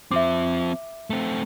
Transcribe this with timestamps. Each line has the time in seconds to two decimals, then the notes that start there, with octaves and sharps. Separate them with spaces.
0.11 F3 C4 E5 D6
1.10 A3 C4